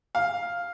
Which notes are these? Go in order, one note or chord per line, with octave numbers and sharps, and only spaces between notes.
F5